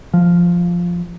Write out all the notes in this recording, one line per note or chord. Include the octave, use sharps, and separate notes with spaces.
F3